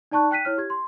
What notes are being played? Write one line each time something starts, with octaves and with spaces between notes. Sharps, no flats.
D#4 D5 A5 C#6 F#6
G5 F#6 B6 D#7
E4 C#5 F6
G4 G#6
C6